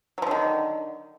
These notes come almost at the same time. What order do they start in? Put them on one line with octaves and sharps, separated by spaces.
F#3 F3 D3 D#3